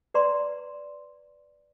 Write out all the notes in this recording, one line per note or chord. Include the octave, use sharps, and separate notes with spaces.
B4 D5 A#5 C6